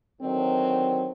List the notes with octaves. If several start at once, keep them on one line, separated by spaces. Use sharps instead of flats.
D3 D#3 F#3 C4